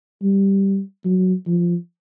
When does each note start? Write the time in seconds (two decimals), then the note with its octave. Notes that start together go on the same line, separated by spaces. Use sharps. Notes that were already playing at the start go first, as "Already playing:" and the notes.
0.22 G3
1.05 F#3
1.47 F3